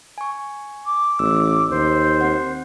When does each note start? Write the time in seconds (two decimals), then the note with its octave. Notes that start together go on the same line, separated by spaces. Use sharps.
0.18 G#5 C#6
0.85 D6
1.19 A1 E6
1.70 D#2 C5
2.21 C4 F#5